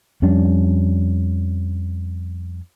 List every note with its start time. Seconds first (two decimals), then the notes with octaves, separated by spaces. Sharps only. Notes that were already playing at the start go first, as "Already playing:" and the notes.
0.22 F2 G3 C#4 D4